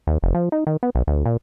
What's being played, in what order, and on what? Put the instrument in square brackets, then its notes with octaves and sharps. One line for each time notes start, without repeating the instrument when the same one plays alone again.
[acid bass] D#2
F1
F3
D#4
D#3
B3
B1
D2
A#2